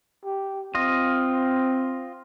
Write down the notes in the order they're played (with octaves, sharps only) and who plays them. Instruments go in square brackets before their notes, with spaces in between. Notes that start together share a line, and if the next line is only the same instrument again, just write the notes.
[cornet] G4
[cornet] C4 [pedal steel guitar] F4 D#5